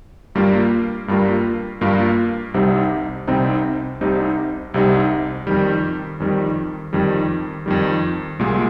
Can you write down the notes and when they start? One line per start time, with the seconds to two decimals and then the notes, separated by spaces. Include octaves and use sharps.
0.35 G2 G3 A#3 F4
1.08 G2 G3 A#3 F4
1.81 G2 G3 A#3 F4
2.54 C2 C3 G3 C4 D#4
3.27 C2 C3 G3 C4 D#4
4.01 C2 C3 G3 C4 D#4
4.74 C2 C3 G3 C4 D#4
5.47 F2 D#3 G3
6.20 F2 D#3 G3
6.93 F2 D#3 G3
7.66 F2 D#3 G3
8.39 C2 A#2 G#3